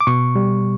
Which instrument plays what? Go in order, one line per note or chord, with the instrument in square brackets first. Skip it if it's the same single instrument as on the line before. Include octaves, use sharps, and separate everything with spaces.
[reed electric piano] D6
B2 C#6
G3